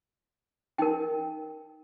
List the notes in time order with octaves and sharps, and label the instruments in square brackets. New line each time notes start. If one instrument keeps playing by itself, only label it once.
[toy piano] D#4 A#4 G5